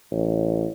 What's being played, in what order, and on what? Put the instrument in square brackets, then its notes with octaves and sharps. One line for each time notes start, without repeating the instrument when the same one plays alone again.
[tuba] A1